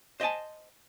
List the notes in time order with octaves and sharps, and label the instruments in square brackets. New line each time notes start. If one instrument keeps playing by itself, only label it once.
[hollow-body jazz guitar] C5 D#5 E5 G#5 A5